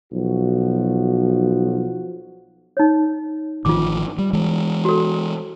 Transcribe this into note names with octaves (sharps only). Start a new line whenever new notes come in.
B1 F3 F#4
D#4 C#5
A1 D#3 F3 F4 D6
G3
E3 G#3
F#4 A4